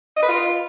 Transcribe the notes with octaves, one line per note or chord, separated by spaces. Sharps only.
D#5
B4
F4